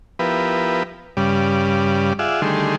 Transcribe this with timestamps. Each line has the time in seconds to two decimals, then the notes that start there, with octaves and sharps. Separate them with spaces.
0.19 F3 B3 E4 G4 A#4 B4
1.17 G2 C#3 G3 D5
2.19 F4 G#4 D5 E5 F#5
2.42 D3 D#3 G3 A3 G#4 C6